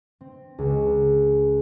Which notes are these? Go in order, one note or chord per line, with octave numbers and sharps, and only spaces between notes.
C4
C#2